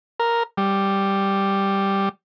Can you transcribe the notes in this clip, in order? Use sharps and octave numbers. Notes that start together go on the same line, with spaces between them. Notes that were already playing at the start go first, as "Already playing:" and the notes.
A#4
G3